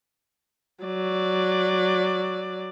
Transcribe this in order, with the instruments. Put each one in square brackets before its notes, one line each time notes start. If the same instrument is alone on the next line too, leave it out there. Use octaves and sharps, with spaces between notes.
[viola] F#3 D5